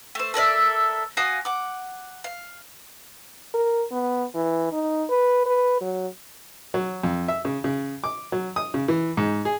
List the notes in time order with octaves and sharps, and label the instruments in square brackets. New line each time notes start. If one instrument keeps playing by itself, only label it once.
[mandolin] A3 C5
A4 A#4 D5 E5
F#4 F5 G#5 D#6
F#5 D6
F5
[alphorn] A#4
B3
E3
D#4
B4
B4
F#3
[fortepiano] F#3
F2
E5
C#3
C#3
D6
F#3
D#6
C#3
E3
G#2
G#4